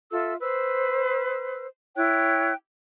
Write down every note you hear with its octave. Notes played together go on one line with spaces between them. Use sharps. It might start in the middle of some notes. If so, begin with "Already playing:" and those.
F4 A4 E5 E6
B4 C5 E6
E4 C#5 G5 F#6